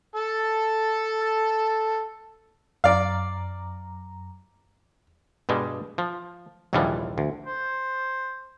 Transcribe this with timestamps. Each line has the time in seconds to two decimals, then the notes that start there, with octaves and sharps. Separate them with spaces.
0.16 A4 A5
2.84 F#2 D5 F5 A#5
5.49 G2 B2 G3 G#3
5.98 F3
6.73 A#1 D#2 C3 E3 F3 G3
7.18 D2
7.46 C5